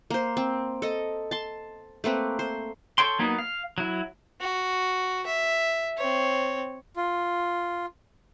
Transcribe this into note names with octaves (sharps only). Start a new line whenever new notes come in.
A#3 C5
C4
A4 D#5
A5 C6
A3 A#3 C4 B4
C5
A4 C#5 G5 C6
F#3 A#3 B3 D#4
F5
F#3 E4
F#4
E5
C4 C#5
F4